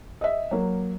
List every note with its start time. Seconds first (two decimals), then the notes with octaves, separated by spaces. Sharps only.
0.21 D#5 E5
0.51 F#3 A#3